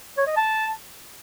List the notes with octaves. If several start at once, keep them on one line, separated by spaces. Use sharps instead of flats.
C#5
D#5
A5